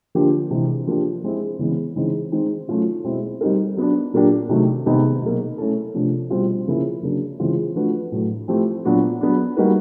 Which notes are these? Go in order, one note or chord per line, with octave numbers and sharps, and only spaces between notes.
D3 F3 A#3 D4 G4
C3 E3 G#3
F3 A#3 D4 G4
G#3 C4 E4 G#4
C#3 E3 G#3 B3
C#3 E3 G#3 C4 D#4
D#3 G#3 C4 D#4
F#3 A3 C#4 F4
B2 G#3 C4 E4
G3 C4 D#4 G4 A#4
F#3 B3 D4
A#2 F#3 A#3 D4 G4
C3 D#3 F#3 A3
C3 D#3 G#3 B3 D#4
B2 F#3 A#3
A3 C#4 E4 A4
C3 F3 A3 D4
B2 G3 C4 F4
C#3 F3 A#3 C#4 E4
C#3 F#3 A#3 D4
C#3 E3 G#3 C4 F4
F3 A3 D4 F#4 B4
A2 F#3 A3
F3 A3 C4 E4 G4
A#2 F#3 B3 D4 F#4
F#3 B3 D4
G3 A#3 D#4 F#4 B4